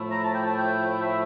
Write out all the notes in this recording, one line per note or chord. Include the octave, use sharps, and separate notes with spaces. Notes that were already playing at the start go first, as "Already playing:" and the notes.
Already playing: A2 F3 A3 E4
A#5
A5
G5
A5
G5
E5